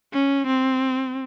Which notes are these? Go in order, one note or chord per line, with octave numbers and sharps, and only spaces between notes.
C#4
C4